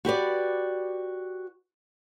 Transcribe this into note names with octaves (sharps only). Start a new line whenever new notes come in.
F#4 G4 B4 D5